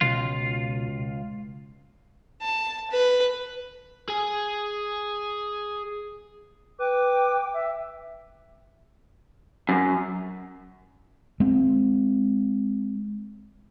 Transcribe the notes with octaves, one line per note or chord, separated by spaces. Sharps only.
C#2 B2 F4
A5
B4
G#4 G#5
B4 G5 D6
E5
F#2
G#3 C4